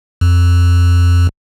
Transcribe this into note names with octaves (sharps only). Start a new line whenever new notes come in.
F2